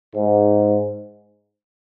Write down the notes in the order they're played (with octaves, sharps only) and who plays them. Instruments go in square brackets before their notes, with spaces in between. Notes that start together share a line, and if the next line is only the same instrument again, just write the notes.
[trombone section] G#2